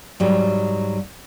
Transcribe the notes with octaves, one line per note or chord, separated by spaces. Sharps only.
G#2 F#3 G3